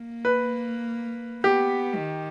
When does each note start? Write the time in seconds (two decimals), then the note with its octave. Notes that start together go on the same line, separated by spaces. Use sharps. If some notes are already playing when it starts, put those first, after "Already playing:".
Already playing: A#3
0.25 B4
1.44 B3 G4
1.95 D#3